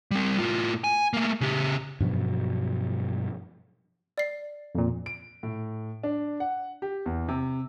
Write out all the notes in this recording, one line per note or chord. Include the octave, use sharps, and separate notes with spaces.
G3 C4
A2 F4
G#5
A3 A#3
C#3 G4
G2 B2 F3 F#3
D5 C7
F2 A#2
D7
A2
D4
F#5
G4
E2
C3